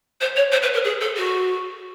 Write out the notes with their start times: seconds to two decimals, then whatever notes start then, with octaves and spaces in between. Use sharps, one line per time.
0.21 C5
0.36 C#5
0.52 C5
0.62 B4
0.73 A#4
0.84 G#4
1.01 A4
1.17 F#4